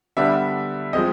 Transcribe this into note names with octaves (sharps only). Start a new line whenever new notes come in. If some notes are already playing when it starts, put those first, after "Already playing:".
D3 G3 B3 D4 E5
F3 G#3 C4 D#5